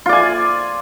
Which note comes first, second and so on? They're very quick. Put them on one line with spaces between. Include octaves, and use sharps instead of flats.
F4 D5 G#5